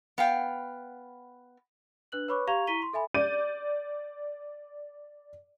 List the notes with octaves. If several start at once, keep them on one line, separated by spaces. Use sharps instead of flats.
B3 F5 G5
D4 B4 F#6 F#7
B4 C#5 B5 C#6 D6 F#6
G4 F5 A#5 C#6 G#6 F7
E4 A#5 C#6 B6 D#7 G7
C6
A4 E5 G#5 B5
D5 G6 D#7